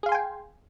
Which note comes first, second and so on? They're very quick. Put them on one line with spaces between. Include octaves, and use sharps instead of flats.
G#4 F5 C6 G#5 G5